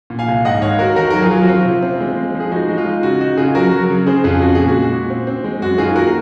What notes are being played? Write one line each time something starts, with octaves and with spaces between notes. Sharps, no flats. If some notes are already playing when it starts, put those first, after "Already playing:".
A#2
F5 G#5
C2
G#2 D#5 F#5
D#3 C#5 F5
D#3 F#4 A#4
D#3 F#4 A#4
F#3 A#4
F4 G#4
F#3
F#4
C4 F4
C3
C4
G#3
G#3
F3
G#4
D#4 F#4
G#3
F4
D#4
C#3 F#4
D#4 F#4
C#3 F4 G#4
F#3 F#4 A#4
F#3
C#3
C#3 G#4 C5
F2 F4 G#4
C#3 F#4
A#2 G#4
F#4
G#3
A#2
C4
C4
G#3
F#2 F#4
D#3 F4 G#4
A#3 F#4 A#4